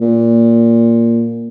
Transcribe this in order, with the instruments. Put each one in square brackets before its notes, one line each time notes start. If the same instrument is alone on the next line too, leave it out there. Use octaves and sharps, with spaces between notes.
[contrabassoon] A#2